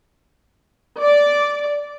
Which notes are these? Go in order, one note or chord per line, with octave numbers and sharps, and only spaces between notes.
D5